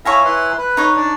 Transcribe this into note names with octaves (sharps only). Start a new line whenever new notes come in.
E4 C#5 E5 F5 G#5 A#5
E4 B4 C6
B4
D#4 C#5
D4 D5